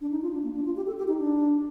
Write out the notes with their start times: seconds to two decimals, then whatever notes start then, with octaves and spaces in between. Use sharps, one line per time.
0.01 D4
0.11 D#4
0.22 F4
0.33 D4
0.43 A#3
0.55 D4
0.65 F4
0.76 G4
0.87 A4
0.97 G4
1.08 D#4
1.19 D4